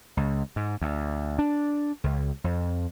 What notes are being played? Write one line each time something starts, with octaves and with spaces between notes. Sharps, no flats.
C#2
G#2
D2
D4
C#2
F2